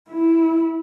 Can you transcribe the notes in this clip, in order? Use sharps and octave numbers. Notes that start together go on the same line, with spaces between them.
E4